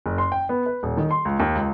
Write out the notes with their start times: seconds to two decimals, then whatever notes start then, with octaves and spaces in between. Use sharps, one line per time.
0.06 F#1
0.18 C6
0.32 G5
0.49 B3
0.66 B4
0.83 D#1
0.97 D#3
1.11 C6
1.25 C#2
1.40 D#2
1.55 C#2